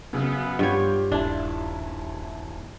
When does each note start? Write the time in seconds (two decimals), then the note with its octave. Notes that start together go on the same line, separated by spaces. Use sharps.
0.13 F#2 C#3 B3
0.59 G2 F4 G4 C#5
1.12 D#1 D4 E4 F4 A5